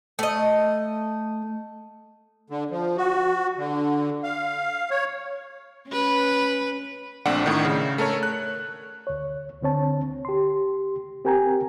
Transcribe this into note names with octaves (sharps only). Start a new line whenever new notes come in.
A3 D#5
D3
F3
F#4
D3
F5
C#5
C#4 B4
A#1 A3 C4 D4 F#5
A2 D#3 D4
C#3
A3 A4 A#4 C#5
F#6
D2 C#5
D2 D3 C4 C#5 A5
G4 C6
C4 G4 A#4 G5 G#5 A#5